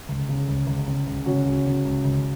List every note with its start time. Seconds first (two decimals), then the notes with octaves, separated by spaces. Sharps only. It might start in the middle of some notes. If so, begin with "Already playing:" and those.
0.09 C#2
0.29 C#3
0.49 C#2
0.67 C#2
0.88 C#3
1.07 C#2
1.26 C#3 C#4 F#4
1.45 C#2
1.66 C#3
1.85 C#2
2.05 C#2